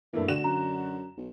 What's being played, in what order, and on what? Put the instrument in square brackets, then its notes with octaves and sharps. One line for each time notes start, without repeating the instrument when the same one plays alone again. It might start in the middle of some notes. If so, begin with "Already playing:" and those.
[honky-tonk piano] G2 A3 A#3 [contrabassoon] E3
[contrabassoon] D2 [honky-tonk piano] D3 F#4 E7
[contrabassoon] F#2 [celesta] A#5
[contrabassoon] B1